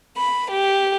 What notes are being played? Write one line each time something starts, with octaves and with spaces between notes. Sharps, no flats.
B5
G4